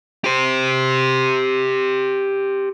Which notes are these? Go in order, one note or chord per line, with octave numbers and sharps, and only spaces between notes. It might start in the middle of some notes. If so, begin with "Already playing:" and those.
G4 C5